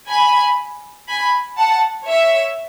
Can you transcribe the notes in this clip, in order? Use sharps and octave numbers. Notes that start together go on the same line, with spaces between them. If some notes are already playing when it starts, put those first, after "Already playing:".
G#5 B5
G#5 B5
F#5 A5
C#5 E5